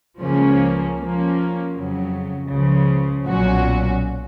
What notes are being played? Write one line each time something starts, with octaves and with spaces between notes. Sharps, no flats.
C#2 C#3 F3 A#3 C#4
F3 A#3 C#4
F2 C#3 F#3
C#2 C#3 F3
B1 A#2 F#3 C#4 F#4